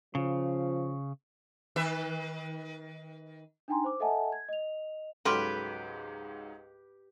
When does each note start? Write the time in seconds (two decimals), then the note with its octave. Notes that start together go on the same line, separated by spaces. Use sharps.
0.15 C#3 F3
1.76 D#3 B4 E5
3.68 D4 D#4 G5 G#5 A#5 C6
3.84 C5 D6
4.00 A4 D#5 E5 F#5 G#5 A5
4.32 G#6
4.49 D#5 F7
5.25 C#2 G#2 F#3 G4 A4 B4 C6 F6